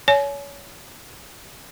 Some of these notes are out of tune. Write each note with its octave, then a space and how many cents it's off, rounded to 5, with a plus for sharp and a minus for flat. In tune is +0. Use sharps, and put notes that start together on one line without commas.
C#5 +25 G#5 +40